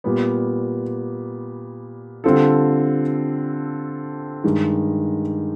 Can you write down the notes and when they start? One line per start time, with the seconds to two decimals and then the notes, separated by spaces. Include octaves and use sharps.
0.04 A#2 G3 B3
2.24 D3 G3 C4 F4 A4
4.44 G2 D#3 G#3